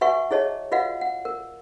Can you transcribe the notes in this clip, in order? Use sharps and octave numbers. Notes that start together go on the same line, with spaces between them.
F#4 B4 E5 F#5 G#5 C#6
E4 G#4 C#5 D#5 A5
F4 F#4 B4 D#5 F5 F#5
F#5
A#4